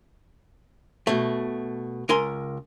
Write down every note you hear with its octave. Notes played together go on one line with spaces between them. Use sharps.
B2 A3
C#2 A#4 G#5 A#5 C6